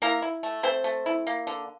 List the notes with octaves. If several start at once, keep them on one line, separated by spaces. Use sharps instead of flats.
A#3 E4 A#4
E4
A3
A3 C4 C5
A3
E4
A#3
D3